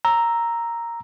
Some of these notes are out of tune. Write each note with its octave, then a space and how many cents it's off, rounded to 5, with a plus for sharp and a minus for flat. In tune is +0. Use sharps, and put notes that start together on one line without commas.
A#5 +0 E6 +0